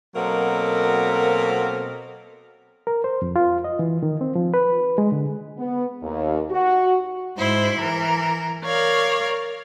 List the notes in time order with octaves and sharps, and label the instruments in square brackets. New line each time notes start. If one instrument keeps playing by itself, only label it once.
[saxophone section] B2 F#3 A#3 C4 A4 A#4
[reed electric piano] A#4
C5
F2
F4
D#5
E3
D#3
C4
F3
B4
G#3
D3
[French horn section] B3
D#2
F#4
[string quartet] G#2 E4 C5
E3 A#4
A#4 C#5 D5 F5